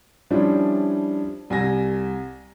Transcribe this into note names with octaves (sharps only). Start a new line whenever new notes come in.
F3 G3 C#4 D4 E4
C2 G#5 A#6